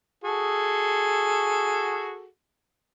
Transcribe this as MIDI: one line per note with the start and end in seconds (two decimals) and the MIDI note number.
0.24 2.27 66
0.24 2.27 68
0.24 2.27 69